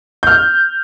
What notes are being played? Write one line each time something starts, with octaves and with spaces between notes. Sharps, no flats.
F6 G6